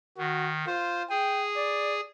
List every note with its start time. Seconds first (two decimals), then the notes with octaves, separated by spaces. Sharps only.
0.18 D#3 F#4
0.67 F4 C5
1.10 G#4 G5 G#5
1.57 D5